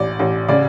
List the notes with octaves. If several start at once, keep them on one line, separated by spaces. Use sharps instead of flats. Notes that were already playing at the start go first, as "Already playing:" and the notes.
Already playing: A1 D5
A1
C#3 D5